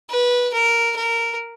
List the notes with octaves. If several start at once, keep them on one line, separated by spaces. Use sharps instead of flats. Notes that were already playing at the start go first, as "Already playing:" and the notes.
B4
A#4
A#4